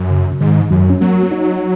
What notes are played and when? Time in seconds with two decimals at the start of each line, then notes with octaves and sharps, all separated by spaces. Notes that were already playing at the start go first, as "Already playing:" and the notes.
Already playing: F#2
0.10 C#3
0.41 G#2 D#3
0.71 F#2 F#3
0.90 C#4
1.01 F#3 A#3
1.31 D#4